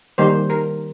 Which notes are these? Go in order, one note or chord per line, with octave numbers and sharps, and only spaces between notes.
D#3 G3 A#3 C5
A#4